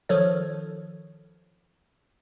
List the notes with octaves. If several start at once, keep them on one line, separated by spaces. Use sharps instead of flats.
D#3 F3 A4 C#5